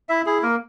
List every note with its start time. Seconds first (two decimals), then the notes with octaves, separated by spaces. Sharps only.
0.09 E4 E5
0.26 E4 G#4
0.43 A#3 A#4